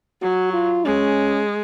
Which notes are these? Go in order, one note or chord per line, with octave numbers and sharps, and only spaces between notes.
F#3 F#4
F4
G#3 C#4